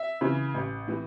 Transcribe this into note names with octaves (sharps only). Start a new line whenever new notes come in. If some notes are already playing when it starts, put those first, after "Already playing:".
Already playing: E5
C#3 E3
A1
A2 E3